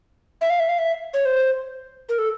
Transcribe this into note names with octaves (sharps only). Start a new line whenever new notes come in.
E5
F5
E5
F5
E5
C#5
C5
A#4
A4